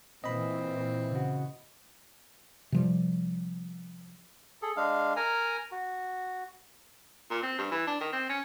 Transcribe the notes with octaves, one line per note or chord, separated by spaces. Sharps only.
A#2 E3 C4 D#5 B5
C#3 F#4
C3 F3 G3
G#4 A4
G#3 D4 F5
A#4 G#5 A#5
F#4
A#2
C4
G2
E3
D4
D#3
C4
C#4